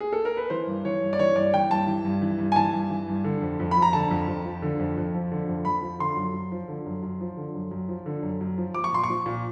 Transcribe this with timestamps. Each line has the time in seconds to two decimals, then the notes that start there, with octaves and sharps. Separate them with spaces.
0.00 G#4
0.13 A4
0.25 A#4
0.37 B4
0.50 E3 C5
0.67 G2
0.85 E3 C#5
1.01 G2
1.13 D5
1.19 E3 C#5
1.35 G2 D5
1.54 E3 G5
1.70 G2 A5
1.87 E3
2.05 G2
2.22 E3
2.38 G2
2.52 G#5
2.56 E3 A5
2.73 G2
2.90 E3
3.08 G2
3.24 D3
3.42 F2
3.60 F2
3.71 F3 B5
3.82 A#5
3.93 D3 A5
4.11 F2
4.28 F2
4.45 F3
4.62 D3
4.79 F2
4.97 F2
5.14 F3
5.32 D3
5.48 F2
5.65 F2 B5
5.82 F3
5.99 D3 C6
6.16 F#2
6.34 F#2
6.52 F3
6.68 D3
6.86 F#2
7.03 F#2
7.21 F3
7.37 D3
7.54 F#2
7.71 F#2
7.89 F3
8.06 D3
8.23 F#2
8.41 F#2
8.58 F3
8.74 F3 D6
8.84 C#6
8.92 A#2 C6
9.04 C#6
9.10 F3
9.26 A#2